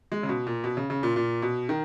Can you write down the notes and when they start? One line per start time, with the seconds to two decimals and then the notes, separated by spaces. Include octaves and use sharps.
0.12 G#3
0.23 C#3
0.29 B2
0.47 A#2
0.64 B2
0.77 C#3
0.90 C#3
1.03 A#2
1.16 A#2
1.42 B2
1.69 D#3